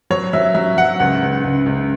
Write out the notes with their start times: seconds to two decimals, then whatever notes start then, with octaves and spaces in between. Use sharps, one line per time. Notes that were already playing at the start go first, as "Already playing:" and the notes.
0.10 F#3 C#5
0.33 F#3 E5
0.54 F#3 E5
0.77 F#3 F#5
1.00 C#2 F#5
1.22 C#2
1.44 C#2
1.66 C#2